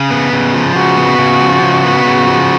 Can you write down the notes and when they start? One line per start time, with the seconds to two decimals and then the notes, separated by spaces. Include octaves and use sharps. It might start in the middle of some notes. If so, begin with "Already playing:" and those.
Already playing: C#3
0.10 B3
0.33 C#3
0.54 F3
0.75 C#3 F#4
0.97 B3
1.18 C#3
1.40 F3
1.62 C#3
1.84 B3
2.05 C#3
2.26 F3